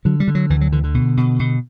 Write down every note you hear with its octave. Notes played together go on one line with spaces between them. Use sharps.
D3 F#3
G3
D3
F#3
D2 E3
F#3
D3 E3
D3
B2
B2
B2